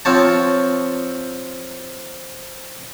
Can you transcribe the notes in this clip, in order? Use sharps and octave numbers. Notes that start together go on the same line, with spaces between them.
F3 C4 C#5 A5